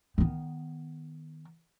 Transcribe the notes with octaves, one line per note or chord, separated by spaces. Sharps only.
D#3 B3